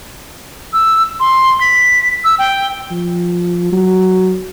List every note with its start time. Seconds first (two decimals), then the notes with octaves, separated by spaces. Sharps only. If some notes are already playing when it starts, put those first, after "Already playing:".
0.73 E6
1.20 C6
1.61 B6
2.25 E6
2.39 G5
2.91 F3
3.72 F#3